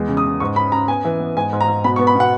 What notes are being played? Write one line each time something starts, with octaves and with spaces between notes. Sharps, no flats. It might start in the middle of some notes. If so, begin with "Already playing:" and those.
Already playing: E2 G#3
C#3
D#6
C#3
G#2 C#6
C#4 B5
C#4 A#5
B3 G#5
E3
B3
G#2 G#5
G#2
A#5
G#2
B2 B5
C#6
B3
B5
B2 F#5